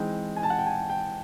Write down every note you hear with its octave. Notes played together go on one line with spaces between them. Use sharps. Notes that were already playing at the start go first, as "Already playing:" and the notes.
Already playing: E3 G#3 C4 D#4
G#5
A5
F#5
G5
G#5
G5